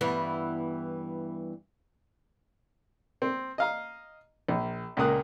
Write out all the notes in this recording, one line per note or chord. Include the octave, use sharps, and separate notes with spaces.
G2 E3 B3
C4
D#5 F5 A#5
A#1
C#2 A#2 A#3 D#6 F#6